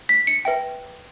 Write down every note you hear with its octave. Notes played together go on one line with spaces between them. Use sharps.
B6
C#7
B4 E5 G5